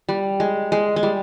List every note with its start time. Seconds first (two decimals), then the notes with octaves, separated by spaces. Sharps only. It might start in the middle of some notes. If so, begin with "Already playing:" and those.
0.09 G3
0.40 G#3
0.72 G#3
0.96 G#3
1.03 G3